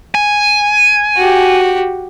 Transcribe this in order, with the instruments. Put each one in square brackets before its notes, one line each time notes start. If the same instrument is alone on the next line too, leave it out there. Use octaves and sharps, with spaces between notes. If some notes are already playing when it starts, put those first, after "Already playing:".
[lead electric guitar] G#5
[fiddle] F#4 G4